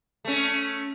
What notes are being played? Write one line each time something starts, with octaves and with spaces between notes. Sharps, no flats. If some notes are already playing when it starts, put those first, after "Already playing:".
A3 C#4